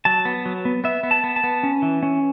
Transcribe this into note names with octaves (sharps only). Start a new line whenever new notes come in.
F#3 A5
B3
F#3
B3
B3 E5
B3
A5
B3
A5
B3
C#4
E3
C#4